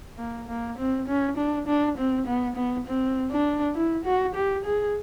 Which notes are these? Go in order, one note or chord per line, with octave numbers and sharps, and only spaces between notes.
A#3
A#3
C4
C#4
D4
D4
C4
B3
B3
C4
D4
E4
F#4
G4
G#4